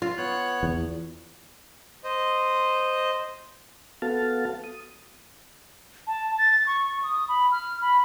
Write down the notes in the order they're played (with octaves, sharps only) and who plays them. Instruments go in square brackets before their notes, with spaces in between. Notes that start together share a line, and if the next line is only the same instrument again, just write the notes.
[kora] F4
[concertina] B3 C#5 F#6
[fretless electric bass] E2
[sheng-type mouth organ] C5 D#5
[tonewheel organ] B3 F#4 A4 F5 A5
D#6
[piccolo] A5
A6
C#6
D#6
B5
F6
B5